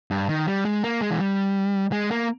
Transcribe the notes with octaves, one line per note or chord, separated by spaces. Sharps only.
G2
D#3
G3
G#3
A#3
G#3
E3
G3
G#3
A#3